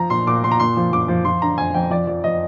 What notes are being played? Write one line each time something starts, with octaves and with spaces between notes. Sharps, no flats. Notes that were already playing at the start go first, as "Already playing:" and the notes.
Already playing: F3 A#5
A#2 C6
A#2 D6
A#2 C6
A#5
A#2 C6
F3
F3 D6
F3
F3 C6
D3 A#5
F2 G#5
F2 G5
F3 D5
F3 D5
F3 D#5